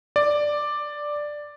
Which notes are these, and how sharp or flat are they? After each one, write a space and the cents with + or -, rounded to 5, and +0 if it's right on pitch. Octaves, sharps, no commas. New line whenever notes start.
D5 +5